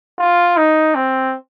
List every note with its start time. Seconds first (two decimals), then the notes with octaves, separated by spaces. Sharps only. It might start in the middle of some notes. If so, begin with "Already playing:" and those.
0.19 F4
0.57 D#4
0.95 C4